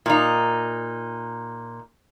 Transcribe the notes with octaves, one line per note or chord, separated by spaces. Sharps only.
A#2 D#4